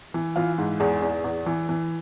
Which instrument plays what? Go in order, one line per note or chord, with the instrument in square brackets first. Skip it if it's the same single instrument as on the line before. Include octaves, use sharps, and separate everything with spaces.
[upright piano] E3
E3 F4
G#2
E2 G#4
E2
E2
E3
E3